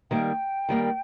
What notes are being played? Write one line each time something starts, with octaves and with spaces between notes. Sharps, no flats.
D#3 G3 A#3 G5
D#3 G3 A#3